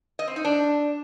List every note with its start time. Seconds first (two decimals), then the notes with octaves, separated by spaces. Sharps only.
0.19 D#5
0.28 C4
0.36 D#4
0.45 D4